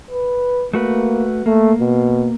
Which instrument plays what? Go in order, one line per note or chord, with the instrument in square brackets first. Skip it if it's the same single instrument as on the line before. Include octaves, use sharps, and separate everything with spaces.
[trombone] B4
[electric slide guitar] A3 F#4 B4 [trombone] A#3
[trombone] A3 [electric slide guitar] A#3
[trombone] B2